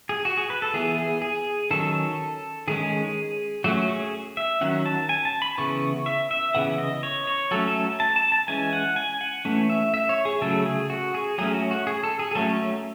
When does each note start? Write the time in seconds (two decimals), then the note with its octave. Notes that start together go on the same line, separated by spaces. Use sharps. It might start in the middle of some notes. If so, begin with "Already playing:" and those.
0.09 G#4
0.25 F#4
0.37 G#4
0.50 B4
0.62 A4
0.74 E3 B3 G#4
0.98 G#4
1.22 G#4
1.71 D#3 F#3 C#4 A4
2.68 D#3 G#3 C#4 G#4
3.64 F#3 A3 C#4 F#4
3.88 G#4
4.37 E5
4.61 D#3 F#3 C#4 F#5
4.86 A5
5.09 G#5
5.25 A5
5.42 B5
5.58 C#3 E3 B3 C#6
6.06 E5
6.31 E5
6.54 C#3 E3 B3 F#5
6.78 D#5
7.03 C#5
7.27 C#5
7.51 F#3 A3 C#4 A4
7.68 A4
8.00 A5
8.16 A5
8.32 A5
8.48 E3 G#3 C#4 G#5
8.73 F#5
8.96 G#5
9.21 F#5
9.45 E3 A3 C#4
9.70 E5
9.94 E5
10.09 C#5
10.25 G#4
10.42 C#3 F#3 A3 A4
10.66 G#4
10.90 F#4
11.14 G#4
11.38 F#3 A3 C#4 G#4
11.54 F#4
11.71 F#4
11.87 G#4
12.03 A4
12.19 G#4
12.31 G#4
12.35 F#3 A3 C#4 A4